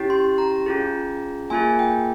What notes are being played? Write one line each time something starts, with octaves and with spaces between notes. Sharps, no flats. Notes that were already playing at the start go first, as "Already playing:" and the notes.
Already playing: C#4 E4 G4
C6
A#5
C#4 F4 G#4
A#3 F4 G#4 G#5
G5